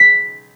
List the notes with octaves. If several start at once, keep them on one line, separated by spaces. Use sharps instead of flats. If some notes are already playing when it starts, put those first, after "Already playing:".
Already playing: B6